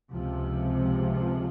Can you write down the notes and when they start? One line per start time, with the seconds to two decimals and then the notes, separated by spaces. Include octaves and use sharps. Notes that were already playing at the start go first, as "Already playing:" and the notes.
0.10 C#2 C3 F3